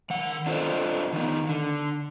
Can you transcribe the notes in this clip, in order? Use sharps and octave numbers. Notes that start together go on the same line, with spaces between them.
D#3 F#5
D4 F4 A4 C5 D5 D#5
D#3 B3 D#4
D3